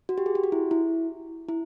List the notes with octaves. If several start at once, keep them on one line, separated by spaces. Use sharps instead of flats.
F#4
G4
G#4
G4
F#4
E4
E4
E4